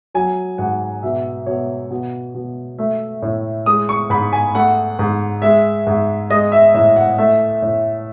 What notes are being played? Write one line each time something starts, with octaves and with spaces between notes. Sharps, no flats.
F#3 G#5
G#2 F#5
B2 E5
B2 C#5
B2
B2
A3 E5
A2
G#3 D#6
C#6
G#2 B5
G#5
A3 F#5
G#2
G#3 E5
G#2
G#3 D#5
E5
A2 E5
F#5
A3 E5
A2